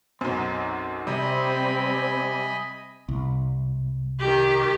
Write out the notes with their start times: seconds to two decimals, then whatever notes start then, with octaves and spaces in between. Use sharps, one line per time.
0.21 B1 F#2 C4 D#4
1.07 C3 G3 C4 D#5 G#5 B5
3.08 C2
4.20 D#3 G4